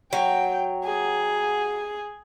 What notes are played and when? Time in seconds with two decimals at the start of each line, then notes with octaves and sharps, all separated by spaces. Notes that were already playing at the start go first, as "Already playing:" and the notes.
0.13 F#3 G5
0.84 G#4